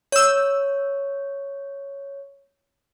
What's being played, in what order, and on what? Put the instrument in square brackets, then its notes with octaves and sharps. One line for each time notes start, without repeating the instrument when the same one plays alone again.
[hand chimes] C#5 [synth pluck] E6 G6